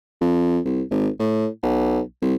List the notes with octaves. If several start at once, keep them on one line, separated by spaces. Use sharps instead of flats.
F2
C2
G#1
A2
B1
C2